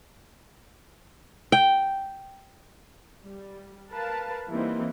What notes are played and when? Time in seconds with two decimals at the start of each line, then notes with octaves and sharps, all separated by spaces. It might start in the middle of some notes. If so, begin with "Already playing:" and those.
1.52 G5
3.24 G3
3.92 A#4 B4 F5 A5
4.50 E3 G3 A#3 C4 D#4